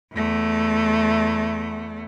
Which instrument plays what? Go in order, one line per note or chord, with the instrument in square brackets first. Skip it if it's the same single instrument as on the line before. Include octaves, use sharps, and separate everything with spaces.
[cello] E2 A3